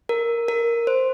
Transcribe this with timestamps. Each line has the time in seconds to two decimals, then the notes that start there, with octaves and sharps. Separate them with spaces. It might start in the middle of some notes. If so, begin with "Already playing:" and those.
0.09 A#4
0.48 A#4
0.87 C5